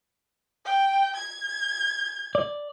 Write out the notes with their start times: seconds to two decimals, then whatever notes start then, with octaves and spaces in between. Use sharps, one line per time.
0.65 G5
1.16 G#6
2.35 D5